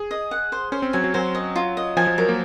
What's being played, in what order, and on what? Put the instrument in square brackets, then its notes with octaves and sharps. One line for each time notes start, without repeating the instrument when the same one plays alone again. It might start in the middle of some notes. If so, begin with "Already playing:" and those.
Already playing: [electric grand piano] G#4
[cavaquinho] D#5
F#5
C5
[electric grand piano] C#4 [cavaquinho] C5
[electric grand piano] C4
[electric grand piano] F#3 [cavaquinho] G#5
[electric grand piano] F#3
[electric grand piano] F#3 [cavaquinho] C5
[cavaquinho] D#5
F4
D#5
[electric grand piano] F3 [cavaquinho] G#5
[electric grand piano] F3
[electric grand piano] F#3 [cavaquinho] A#4
[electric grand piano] A#3